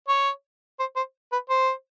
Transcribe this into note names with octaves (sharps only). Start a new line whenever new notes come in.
C#5
C5
C5
B4
C5